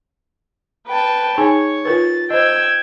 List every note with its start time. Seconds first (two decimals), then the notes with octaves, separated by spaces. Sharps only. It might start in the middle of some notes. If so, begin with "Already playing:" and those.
0.87 B4 G5 A5
1.38 D#4 G#4 C#5 G#5
1.85 F4 A#4 B4 A6
2.30 C5 D#5 G5 E6 G#6